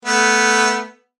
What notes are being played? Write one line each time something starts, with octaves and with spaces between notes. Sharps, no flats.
A3 B3